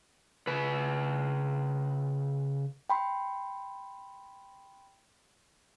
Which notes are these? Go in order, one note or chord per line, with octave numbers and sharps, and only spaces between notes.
C#3 B4
G5 B5 C6